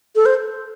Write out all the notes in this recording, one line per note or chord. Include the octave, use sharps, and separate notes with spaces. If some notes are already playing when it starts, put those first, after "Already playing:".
A4
C5